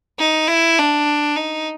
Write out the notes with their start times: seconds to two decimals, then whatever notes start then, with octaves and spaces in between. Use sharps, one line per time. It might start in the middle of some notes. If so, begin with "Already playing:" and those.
0.19 D#4
0.48 E4
0.78 D4
1.36 D#4